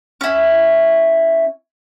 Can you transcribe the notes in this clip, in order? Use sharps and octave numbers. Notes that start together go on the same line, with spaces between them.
C#4 E4